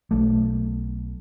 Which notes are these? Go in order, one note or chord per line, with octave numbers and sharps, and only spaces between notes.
B1 A3